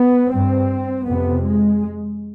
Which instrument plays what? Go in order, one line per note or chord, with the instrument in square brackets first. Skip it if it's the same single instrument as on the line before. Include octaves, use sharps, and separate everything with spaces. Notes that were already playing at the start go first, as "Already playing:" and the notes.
Already playing: [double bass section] B3
G2 C4
F2 C3 B3
G#3